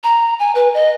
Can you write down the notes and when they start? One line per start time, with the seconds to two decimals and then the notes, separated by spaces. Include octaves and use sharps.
0.03 A#5
0.39 G#5
0.55 B4
0.74 D#5